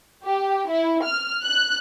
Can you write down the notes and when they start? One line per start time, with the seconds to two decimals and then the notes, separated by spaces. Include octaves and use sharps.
0.25 G4
0.69 E4
1.04 F6
1.44 F#6